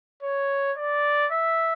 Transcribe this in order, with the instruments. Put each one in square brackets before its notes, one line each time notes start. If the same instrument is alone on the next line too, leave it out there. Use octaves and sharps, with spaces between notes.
[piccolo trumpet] C#5
D5
E5